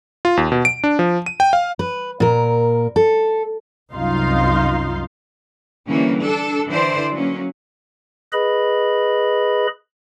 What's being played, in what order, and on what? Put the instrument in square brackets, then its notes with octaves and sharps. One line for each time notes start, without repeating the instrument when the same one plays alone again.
[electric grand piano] F4
D#2
B2
D7
D4
F3
D#7
G5
F5
[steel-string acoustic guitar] B4
A#2 A#4
A4
[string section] C2 F#2 D#4 F4 F5 C6
[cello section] D3 E3 G3 A#3 C#4
D4 A4
D3 E3 C5 D5
F#3 A#3 C#4
[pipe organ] G#4 B4 D#5 B5